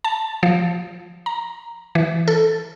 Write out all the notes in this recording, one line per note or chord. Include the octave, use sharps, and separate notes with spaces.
A5
F3
A#5
E3
A4